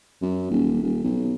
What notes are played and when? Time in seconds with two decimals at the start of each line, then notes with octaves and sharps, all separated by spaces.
0.22 F#2
0.51 D#1
0.82 D#1
1.04 B1